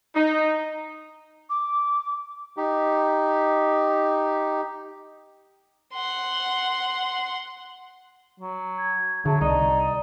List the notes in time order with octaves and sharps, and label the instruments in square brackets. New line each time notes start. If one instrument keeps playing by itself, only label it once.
[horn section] D#4
[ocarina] D6
[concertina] D#4 G4
[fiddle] F#5 C6
[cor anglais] F#3
[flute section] G#6
[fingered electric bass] D3 [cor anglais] F#3 [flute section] G#4 E5 A5
[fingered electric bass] C2 [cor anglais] D#4 [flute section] D5